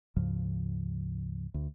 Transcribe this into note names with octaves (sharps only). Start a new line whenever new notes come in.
D2 G#2 C#3 F3
D2